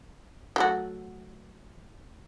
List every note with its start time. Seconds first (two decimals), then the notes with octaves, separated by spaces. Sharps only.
0.56 F#3 A3 F#4